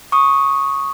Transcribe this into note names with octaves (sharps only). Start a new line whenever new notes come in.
C#6 D#6